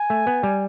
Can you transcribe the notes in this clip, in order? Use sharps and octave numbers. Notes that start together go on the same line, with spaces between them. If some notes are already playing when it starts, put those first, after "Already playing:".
Already playing: G#5
A3
B3
G3